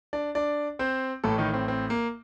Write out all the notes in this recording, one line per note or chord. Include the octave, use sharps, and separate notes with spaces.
D4 D5
D4 D5
C4 C5
A1 A2 A3 A4
D#3 D#4
C4
C4
A#3